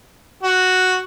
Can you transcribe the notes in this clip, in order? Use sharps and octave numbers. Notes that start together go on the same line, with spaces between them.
F#4